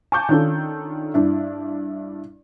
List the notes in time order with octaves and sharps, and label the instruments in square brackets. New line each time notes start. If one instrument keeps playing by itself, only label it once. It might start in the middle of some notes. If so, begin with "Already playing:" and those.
[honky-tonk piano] G#5 A5 C#6 D6 G6
D#3 C#4 D4 F4 A4
G2 D4 E4